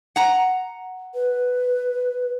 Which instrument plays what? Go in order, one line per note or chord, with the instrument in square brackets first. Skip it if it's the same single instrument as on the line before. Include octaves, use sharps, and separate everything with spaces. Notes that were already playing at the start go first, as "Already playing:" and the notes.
[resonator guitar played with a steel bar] F#5 A#5
[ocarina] B4